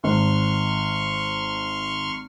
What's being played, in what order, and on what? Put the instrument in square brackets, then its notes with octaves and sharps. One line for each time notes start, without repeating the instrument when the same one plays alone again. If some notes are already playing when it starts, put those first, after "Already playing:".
[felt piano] G#1 [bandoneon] C6 C#6 F6